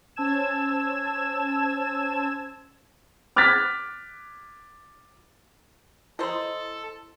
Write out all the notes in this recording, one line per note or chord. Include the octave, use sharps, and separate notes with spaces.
C#4 C5 A5 E6 G#6 E7
D6 F6 F#6 G#6 A6 B6
E4 A4 C5 D#5 C6